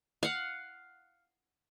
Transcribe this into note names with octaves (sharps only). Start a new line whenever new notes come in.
F5 F#5